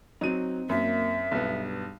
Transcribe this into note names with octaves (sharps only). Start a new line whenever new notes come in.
F#3 C4 D#4 D#7
F#2 A#3 E5
B1 G2 B3